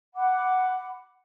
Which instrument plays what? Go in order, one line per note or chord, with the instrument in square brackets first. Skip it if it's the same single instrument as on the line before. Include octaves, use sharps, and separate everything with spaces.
[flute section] F#5 B5 D6